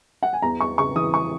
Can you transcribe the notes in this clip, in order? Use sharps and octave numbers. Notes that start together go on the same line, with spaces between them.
F#5
G#5
E2 A#5
E2 C#6
C#3 C#6
E3 D#6
C#6